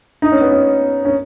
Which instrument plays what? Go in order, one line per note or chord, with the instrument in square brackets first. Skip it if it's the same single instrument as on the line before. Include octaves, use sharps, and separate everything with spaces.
[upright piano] D#4
C#4
B3
C#4
C#4